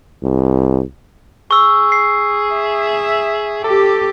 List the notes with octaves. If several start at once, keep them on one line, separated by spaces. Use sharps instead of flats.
C2
G#4 C#6 E6
C7
E5
G4 A4